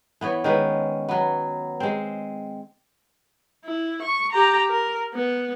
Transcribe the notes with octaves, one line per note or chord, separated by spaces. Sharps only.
E3 B3 C#5
D#3 G#3 C#4 B4
F#3 B3
G#3 C4
E4
C#6
G4 A#5
A#4
B3